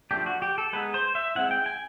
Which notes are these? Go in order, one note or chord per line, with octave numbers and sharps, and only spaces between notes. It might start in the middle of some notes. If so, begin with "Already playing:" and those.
F3 A3 D4 G4
F#4
G4
A4
G#3 B3 D#4 B4
C5
E5
G#3 C4 E4 F#5
G5
G#5